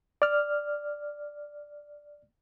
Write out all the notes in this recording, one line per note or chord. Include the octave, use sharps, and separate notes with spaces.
D5 F6